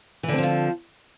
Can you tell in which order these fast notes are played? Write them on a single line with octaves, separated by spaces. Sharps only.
E3 D3 C4 F3 F4